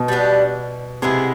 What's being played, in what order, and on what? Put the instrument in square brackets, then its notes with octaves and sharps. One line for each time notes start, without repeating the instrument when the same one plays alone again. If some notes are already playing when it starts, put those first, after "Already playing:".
Already playing: [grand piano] B2
[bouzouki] G3 B3 D4
[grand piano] C3 [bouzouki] G#3 B3 E4 G#4